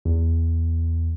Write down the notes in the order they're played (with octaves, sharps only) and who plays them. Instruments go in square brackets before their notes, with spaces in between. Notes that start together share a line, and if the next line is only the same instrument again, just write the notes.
[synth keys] E2